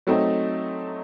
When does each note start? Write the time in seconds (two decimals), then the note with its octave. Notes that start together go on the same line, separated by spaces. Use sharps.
0.07 F#3 A3 C4 D#4